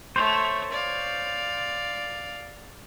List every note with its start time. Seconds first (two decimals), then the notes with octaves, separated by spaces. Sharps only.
0.16 A3 C5 C#5
0.72 D5 F5